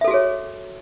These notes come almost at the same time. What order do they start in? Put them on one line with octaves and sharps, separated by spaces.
E5 A4 F#4 G#4 C#5